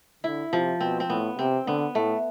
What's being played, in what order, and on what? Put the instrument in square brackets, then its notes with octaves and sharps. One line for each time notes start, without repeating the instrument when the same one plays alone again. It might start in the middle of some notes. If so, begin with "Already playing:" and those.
[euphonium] D3 [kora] E4
[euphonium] C3 [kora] F3
[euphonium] B2 [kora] C4
[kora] C4
[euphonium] A2 [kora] B3
[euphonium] C3 [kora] C4
[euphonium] D3 [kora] B3
[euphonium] A2 [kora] A3